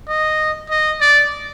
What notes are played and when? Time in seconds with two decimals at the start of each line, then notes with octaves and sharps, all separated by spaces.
0.08 D#5
0.70 D#5
1.01 D5